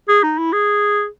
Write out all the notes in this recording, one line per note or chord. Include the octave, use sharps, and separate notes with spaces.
G#4
D#4
E4
G#4